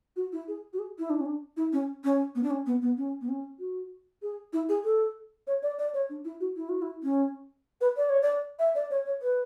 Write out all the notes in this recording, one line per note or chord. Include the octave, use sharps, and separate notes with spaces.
F#4
E4
G#4
F#4
G#4
E4
D4
C#4
D4
E4
C#4
C#4
B3
D4
C#4
B3
B3
C#4
B3
C#4
F#4
G#4
E4
G#4
A4
C#5
D5
D5
C#5
D4
E4
F#4
E4
F#4
E4
C#4
B4
D5
C#5
D5
E5
D5
C#5
C#5
B4